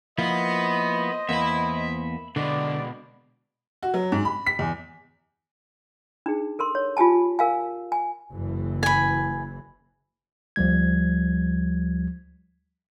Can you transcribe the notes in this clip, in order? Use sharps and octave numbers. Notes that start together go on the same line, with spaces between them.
F3 A#3 B3 E4 C5 D#5
E2 A#3 B3 E5 B5
B2 D3 G#3 D5
F#4
F#3
G#2
B5
B6
E2
D4 D#4 G#4
A4 A#4 C6
C#5
F4 G4 G#5 A5
A#4 F5 G#5
G#5
F#1 E3
G#5 B5
D2 F3 G3 G#6